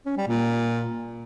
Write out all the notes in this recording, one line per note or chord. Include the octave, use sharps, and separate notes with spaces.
C#4
G3
A#2